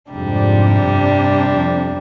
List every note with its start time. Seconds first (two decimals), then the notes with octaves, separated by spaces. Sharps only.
0.12 F2 G#2 C3 G3 D4
0.82 G2
1.51 F2